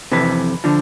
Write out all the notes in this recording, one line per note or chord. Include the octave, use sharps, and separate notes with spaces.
F2 C3 E3 B4
D3 F3